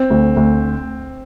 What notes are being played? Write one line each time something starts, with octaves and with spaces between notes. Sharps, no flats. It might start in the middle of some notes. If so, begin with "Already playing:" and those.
Already playing: C4
D2
D2